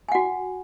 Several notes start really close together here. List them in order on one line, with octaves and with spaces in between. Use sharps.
G#5 F#5 F#4